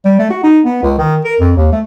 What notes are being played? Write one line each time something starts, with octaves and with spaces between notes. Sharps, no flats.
G3
A3
F#4
D#4
B3
C#2
D#3
A#4
F2
D#2
A3